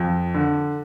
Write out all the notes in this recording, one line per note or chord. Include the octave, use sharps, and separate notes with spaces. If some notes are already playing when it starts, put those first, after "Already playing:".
Already playing: F2
D3